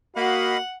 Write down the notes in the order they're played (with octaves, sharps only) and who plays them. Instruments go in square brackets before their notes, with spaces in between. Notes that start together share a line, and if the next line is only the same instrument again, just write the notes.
[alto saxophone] A#3 [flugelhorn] F#4 [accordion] D#5 F5 B5 [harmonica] F#5